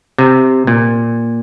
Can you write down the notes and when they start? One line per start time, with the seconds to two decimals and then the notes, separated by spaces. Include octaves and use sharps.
0.18 C3
0.67 A#2